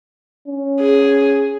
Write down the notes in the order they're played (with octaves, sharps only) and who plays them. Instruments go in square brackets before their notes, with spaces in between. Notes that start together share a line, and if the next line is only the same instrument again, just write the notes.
[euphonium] C#4
[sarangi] G#4